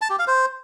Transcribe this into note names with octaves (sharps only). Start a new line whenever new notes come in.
A5
G4
F5
C5